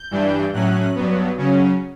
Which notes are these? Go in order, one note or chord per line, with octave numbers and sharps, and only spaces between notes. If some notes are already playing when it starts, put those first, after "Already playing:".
Already playing: G6
G2 E3 G3 D4
A2 F#3 C#4 F#6
G2 F#3 B3
C#3 F#3 C#4